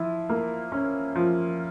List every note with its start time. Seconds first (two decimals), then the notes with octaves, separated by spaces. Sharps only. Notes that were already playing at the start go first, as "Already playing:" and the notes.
Already playing: F3 E4
0.29 A#3
0.72 C#4
1.15 F3